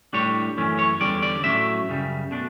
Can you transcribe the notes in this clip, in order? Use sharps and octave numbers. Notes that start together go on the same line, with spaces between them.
A2 G3 D4 C#5
F#2 E3 A3 C#4
C#5
E2 D3 G3 C#4 D5
D5
A2 F#3 A3 C#4 E5
F#2 C#3 G3
B2 A3 D4